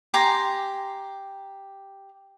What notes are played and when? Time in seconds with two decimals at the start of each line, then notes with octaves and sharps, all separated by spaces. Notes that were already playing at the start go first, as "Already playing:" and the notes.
0.14 G4 G#5 A#5 C6